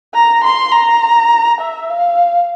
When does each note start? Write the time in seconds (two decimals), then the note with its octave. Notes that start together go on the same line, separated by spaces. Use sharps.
0.14 A#5
0.44 C6
0.72 A#5
1.60 E5
1.90 F5